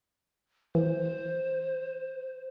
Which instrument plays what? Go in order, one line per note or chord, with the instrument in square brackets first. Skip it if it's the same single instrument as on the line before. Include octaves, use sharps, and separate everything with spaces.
[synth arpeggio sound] E3 [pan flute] C5